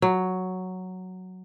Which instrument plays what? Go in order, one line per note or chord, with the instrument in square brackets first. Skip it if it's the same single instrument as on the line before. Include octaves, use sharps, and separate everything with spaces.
[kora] F#3